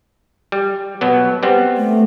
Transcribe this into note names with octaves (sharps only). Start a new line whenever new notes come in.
G3
B2 F#3 B3
G3 B3 C4
A3